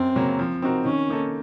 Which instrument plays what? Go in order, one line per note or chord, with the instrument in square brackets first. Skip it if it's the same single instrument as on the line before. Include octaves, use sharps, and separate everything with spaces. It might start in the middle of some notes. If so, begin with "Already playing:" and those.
Already playing: [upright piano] F#2 [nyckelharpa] C4
[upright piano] C#3 F#3 A#3
F3
C4 D#4 F#4 A#4
[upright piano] D#3 [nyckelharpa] C#4
[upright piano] A#3 D#4 A4